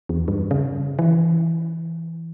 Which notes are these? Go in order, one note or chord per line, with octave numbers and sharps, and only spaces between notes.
E2
G2
C#3
E3